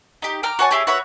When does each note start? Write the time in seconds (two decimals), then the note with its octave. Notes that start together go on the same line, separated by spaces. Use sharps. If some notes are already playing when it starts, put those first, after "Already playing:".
0.22 D#4 G4
0.43 G5 A#5 D6 F6
0.59 F#4 C#5 G#5 A5
0.70 E4 G4 G#4 C#5
0.87 F#4 B4 C#5 E5